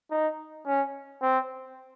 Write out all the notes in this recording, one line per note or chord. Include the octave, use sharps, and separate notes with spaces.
D#4
C#4
C4